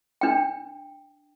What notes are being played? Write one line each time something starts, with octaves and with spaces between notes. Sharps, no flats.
D4 G5